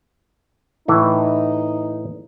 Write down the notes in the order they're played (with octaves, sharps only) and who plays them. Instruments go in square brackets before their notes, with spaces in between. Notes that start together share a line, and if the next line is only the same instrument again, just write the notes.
[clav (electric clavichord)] A2 E3 [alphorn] D#4